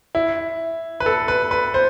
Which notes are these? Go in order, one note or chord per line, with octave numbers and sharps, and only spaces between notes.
E4
B4
A4
B4
B4
C5